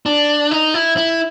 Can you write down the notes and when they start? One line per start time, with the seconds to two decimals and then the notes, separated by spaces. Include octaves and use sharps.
0.06 D4
0.51 D#4
0.74 E4
0.97 E4